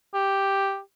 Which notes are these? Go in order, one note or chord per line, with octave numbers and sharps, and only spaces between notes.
G4